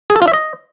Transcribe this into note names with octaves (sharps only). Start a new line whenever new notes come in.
G#4
A4
F4
E5
D#5